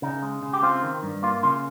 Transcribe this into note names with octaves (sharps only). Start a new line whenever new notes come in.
C#3 D#4
G#3
C#3
G4
C4 F4
D#3
G2
A#3 F4
C#3 F4